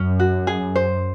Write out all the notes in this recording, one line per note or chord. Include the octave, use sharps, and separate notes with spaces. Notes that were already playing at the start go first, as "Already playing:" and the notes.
Already playing: F#2 C#4
F#4
G#4
C5